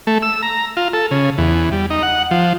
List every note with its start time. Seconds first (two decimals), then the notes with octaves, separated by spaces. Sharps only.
0.07 A3
0.23 E6
0.42 A#5
0.77 F4
0.93 A4
1.11 C#3
1.38 E2
1.72 G3
1.90 D#4
2.03 F#5
2.31 F3